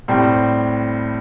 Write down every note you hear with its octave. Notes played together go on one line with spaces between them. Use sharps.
A2 G3 C4